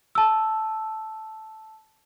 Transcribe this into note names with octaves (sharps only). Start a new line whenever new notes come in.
A5 E6